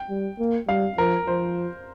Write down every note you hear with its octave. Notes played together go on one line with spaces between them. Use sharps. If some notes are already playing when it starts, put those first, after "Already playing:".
Already playing: G5
G3
A#3
G3 F5
F3 A#4
F3 C5